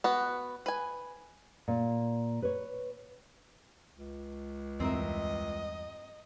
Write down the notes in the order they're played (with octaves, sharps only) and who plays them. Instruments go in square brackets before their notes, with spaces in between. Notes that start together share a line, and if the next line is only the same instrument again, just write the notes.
[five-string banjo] B3 F#4
B4 G#5
[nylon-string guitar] A#2
B4 C#5
[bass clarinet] C#2
[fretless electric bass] E2 G2 [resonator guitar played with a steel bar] C4 A#4 E5 [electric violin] D#5